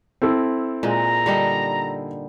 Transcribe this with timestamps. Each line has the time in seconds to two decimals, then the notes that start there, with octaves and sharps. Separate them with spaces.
0.22 C4 E4 A4
0.83 A#2 G#3 A#5
1.26 D3 G3 D#4